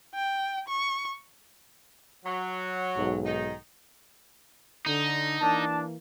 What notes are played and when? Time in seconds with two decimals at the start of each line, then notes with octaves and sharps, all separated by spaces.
0.15 G5
0.68 C#6
2.25 F#3
2.96 B1 G#2
3.25 D#3 D#4
4.86 D3 D#4
5.41 E3 A#3 D4 A5